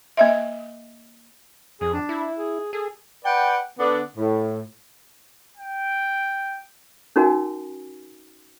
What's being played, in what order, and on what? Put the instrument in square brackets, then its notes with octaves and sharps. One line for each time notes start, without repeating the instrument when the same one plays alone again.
[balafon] A#3 D#5 E5
[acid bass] F2 [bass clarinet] G#4
[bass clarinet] D4
[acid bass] E4
[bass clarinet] G#4
[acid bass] G#4 [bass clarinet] A4
[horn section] B4 D5 F#5 G5
D3 B3 D4
A2
[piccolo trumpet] G5
[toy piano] C#4 D#4 F#4 A#4 G#5